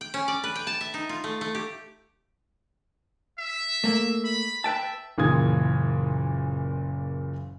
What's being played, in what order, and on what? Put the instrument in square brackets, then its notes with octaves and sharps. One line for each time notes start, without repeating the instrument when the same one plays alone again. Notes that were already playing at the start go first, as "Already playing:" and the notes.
[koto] G5
C#4
D5
B4
G5
A5
E5
D#4
F4
A3
A3
G4
[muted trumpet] E5
[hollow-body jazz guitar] A3 A#3
[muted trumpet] B5
[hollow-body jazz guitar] B4 G5 A5 [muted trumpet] E5
[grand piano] F#1 A#2 C#3 E3 D#6 G#6